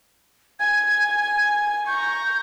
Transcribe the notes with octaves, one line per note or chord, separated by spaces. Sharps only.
G#5 G#6
A#5 C#6 G6